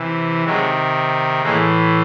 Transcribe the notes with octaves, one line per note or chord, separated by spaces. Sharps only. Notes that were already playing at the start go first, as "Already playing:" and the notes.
Already playing: C3 E3
C3 D#3 F#3 G#3
A2 E3 G#3 A#3